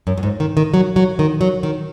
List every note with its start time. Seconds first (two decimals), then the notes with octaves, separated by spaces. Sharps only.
0.07 F#2
0.17 F#2
0.23 G#2
0.40 D#3
0.57 D#3
0.74 F#3
0.96 F#3
1.19 D#3
1.41 F#3
1.63 D#3